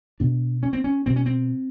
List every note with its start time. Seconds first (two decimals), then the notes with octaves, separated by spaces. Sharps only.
0.20 B2 D4
0.63 C#4
0.73 C4
0.84 C#4
1.06 B2 C4
1.16 C#4
1.26 C4